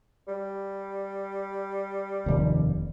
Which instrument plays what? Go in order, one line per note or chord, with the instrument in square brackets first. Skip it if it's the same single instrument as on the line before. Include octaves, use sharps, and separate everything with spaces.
[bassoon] G3
[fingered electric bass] F1 D#2